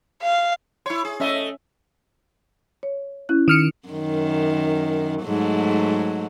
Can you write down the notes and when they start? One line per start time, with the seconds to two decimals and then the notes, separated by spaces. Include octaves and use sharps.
0.23 F5
0.86 E4 C#5 C6
1.05 G#4
1.20 A3 C#4 D#5 E5
2.83 C#5
3.29 C#4 E4 F#6
3.48 D#3 F6 C#7
3.88 F#2 D#3
5.23 G#2 F#3 A3